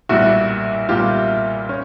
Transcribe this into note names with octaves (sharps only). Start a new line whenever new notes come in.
B1 A#2 G3 E4 F#4
B1 A#2 G3 F4 G4
C#4